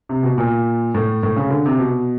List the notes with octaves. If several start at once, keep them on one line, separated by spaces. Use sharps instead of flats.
C3
B2
A#2
A2
A2
C#3
D3
C3
B2